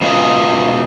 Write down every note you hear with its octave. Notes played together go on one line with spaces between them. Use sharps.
B2 G#3 F4 B4 D#5